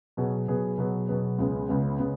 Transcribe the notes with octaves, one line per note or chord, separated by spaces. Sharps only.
B2 F#3 B3 G#4
B2 F#3 B3 G#4
B2 F#3 B3 G#4
B2 F#3 B3 G#4
C#2 C#3 G#3 B3
C#2 C#3 G#3 B3
C#3 G#3 B3